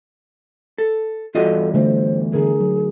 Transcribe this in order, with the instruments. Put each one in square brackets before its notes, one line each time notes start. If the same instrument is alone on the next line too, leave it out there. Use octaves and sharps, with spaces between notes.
[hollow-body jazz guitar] A4
[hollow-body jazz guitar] E2 G2 D#5 [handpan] F4 F#4 [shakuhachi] A4
[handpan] D3 A3 [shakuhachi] C5
[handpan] D3 A#4 [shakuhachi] G#4
[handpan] F#3